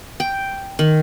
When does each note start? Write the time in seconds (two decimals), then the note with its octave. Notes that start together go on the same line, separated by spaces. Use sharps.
0.20 G5
0.79 D#3